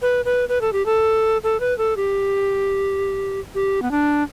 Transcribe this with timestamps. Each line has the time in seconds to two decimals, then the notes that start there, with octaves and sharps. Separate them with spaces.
0.02 B4
0.25 B4
0.49 B4
0.61 A4
0.73 G4
0.86 A4
1.44 A4
1.60 B4
1.78 A4
1.97 G4
3.55 G4
3.82 B3
3.91 D4